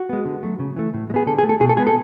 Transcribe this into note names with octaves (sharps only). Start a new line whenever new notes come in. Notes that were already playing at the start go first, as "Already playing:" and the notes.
Already playing: F#4
G#3 B3
D3
F#3 A3
C#3
E3 A3
A2
G#3
B3 G#4
D3 A4
G#4
A3
A4
B2 G#4
A4
G#3 B3 G#4
A4